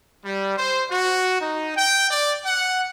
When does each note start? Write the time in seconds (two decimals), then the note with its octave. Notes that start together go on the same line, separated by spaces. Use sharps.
0.25 G3
0.57 C5
0.91 F#4
1.41 D#4
1.77 G5
2.11 D5
2.45 F#5